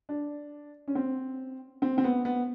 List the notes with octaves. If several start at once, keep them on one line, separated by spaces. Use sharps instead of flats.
D4
C#4
C4
C4
C4
B3
B3